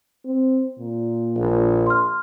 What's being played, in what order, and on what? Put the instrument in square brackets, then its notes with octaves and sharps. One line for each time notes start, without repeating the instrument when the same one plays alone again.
[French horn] C4
A#2
[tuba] A#1
[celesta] C6 F6